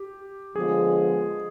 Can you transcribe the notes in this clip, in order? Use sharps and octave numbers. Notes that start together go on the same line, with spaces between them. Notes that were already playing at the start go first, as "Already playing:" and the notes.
Already playing: G4
D3 F3 G#3 B3 F4 G#4